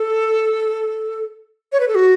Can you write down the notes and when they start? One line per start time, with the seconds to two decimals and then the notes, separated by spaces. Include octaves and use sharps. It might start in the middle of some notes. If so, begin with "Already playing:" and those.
Already playing: A4
1.72 C#5
1.80 B4
1.88 A4
1.95 F#4